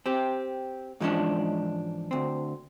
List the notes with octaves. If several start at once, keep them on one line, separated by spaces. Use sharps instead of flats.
C4 G4
G#2 E3 F3 G#3 C#4 D4
D2 C4